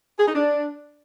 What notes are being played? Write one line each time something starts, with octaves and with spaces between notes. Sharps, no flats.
G#4
D#4
D4